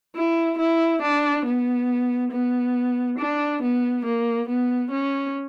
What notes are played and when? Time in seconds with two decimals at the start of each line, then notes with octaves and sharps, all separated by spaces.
0.16 E4
0.58 E4
1.02 D4
1.45 B3
2.31 B3
3.19 D4
3.62 B3
4.05 A#3
4.49 B3
4.91 C#4